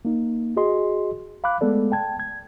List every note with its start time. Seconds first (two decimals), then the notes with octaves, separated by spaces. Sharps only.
0.05 A#3 D#4
0.57 F#4 G#4 D#5 C6
1.44 F5 B5 D6 F#6
1.61 G#3 A3 B3 A4 D5
1.92 G5 A5 G#6
2.20 G#6